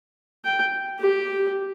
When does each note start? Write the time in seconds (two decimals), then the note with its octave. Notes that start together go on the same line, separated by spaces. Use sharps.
0.45 G5
0.99 G4